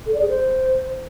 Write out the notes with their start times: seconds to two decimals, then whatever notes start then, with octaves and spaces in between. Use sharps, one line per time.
0.06 A4
0.14 D5
0.21 G#4
0.29 C5